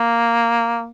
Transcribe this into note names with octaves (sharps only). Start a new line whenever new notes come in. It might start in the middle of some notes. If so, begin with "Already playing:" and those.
Already playing: A#3